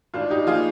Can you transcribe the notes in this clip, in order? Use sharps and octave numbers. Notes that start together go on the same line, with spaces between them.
G#1 D4 F4
D#4 G4
F3 A#3 F4 G#4